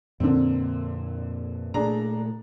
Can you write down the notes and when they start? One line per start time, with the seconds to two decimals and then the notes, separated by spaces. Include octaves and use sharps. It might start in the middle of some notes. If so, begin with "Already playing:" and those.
0.20 F2 A#2 D3 A#3 C4
1.74 A#2 A3 D4 G#4 A#5